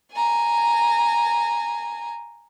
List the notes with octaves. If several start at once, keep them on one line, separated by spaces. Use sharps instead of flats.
G#5 A#5